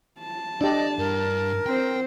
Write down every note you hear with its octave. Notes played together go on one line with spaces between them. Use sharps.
A5
D4 G4 D5 D#5
G2 A#4
C4 C5 G5